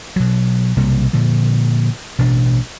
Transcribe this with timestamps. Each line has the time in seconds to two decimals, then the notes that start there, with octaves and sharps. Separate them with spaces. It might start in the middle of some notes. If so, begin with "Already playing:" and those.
0.16 B2 F#3
0.76 B1 C3 G3 A#3
1.13 A#2 D3 F3
2.19 A1 B2 D4